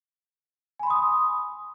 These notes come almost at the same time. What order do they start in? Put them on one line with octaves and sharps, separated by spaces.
G#5 B5 C6 D#6